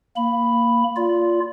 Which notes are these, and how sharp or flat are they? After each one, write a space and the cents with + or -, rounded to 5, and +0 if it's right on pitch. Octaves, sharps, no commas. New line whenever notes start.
A#3 -5 B5 +0
F4 -5 D5 -25